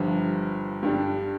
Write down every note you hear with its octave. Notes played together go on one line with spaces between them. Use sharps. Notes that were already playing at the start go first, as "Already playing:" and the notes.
Already playing: G1 G2 F3
G2 D3 G3 D4